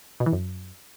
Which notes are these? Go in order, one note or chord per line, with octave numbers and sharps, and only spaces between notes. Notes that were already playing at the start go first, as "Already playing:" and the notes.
B2
E3
F#2